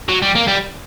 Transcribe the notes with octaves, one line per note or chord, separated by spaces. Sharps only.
F#3
G3
A#3
G3